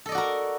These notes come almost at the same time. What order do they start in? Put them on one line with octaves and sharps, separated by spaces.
A4 D#5 D5 F#4 A#4